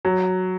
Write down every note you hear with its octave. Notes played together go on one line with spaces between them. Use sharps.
F#3